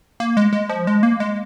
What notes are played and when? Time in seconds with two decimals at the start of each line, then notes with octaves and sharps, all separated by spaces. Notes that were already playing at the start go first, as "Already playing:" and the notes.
0.20 A#3
0.37 G#3
0.53 G#3
0.69 F3
0.87 G#3
1.03 A#3
1.20 G#3